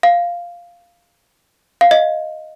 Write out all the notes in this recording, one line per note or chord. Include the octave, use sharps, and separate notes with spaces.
F5
F5
D#5